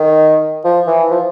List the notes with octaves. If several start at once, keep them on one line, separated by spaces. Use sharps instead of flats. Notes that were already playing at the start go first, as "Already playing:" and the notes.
Already playing: D#3
F3
E3
F3